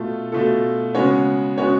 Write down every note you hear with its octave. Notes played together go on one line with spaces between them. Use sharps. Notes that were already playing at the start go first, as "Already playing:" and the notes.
Already playing: B2 A3 F4 A4
B2 A3 F4 A4
C#3 G#3 B3 F#4 C#5
C#3 G#3 B3 F#4 C#5